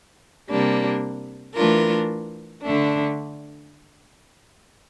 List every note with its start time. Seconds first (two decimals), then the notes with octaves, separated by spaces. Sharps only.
0.50 C3 G3 A#3 D4
1.55 E3 A3 D4 F4 A#4
2.63 D3 A3 D4